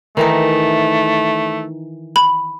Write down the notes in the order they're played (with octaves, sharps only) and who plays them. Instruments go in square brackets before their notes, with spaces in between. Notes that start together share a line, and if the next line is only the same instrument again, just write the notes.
[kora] D#3 E3 D#4 [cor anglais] A3
[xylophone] B5